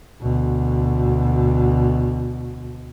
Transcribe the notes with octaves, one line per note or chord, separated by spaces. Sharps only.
D2 B2